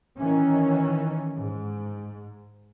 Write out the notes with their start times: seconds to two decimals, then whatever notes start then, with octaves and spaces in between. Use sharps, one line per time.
0.18 D#3 E3 C#4
1.38 G#2